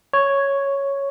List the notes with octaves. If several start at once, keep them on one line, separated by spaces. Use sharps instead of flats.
C#5